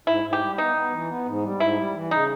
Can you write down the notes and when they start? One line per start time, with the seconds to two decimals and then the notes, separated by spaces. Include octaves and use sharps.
0.07 G#2 E4
0.24 G#2
0.33 G4
0.41 G3
0.58 B3 D#4
0.76 B3
0.92 E3
1.10 B3
1.26 G#2
1.43 G3
1.60 G#2 E4
1.77 G3
1.94 E3
2.11 C#3 D#4